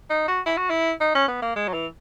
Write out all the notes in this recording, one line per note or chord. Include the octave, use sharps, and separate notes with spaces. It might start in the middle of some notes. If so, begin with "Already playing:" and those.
D#4
F#4
E4
F#4
E4
D#4
C#4
B3
A#3
G#3
F#3
E3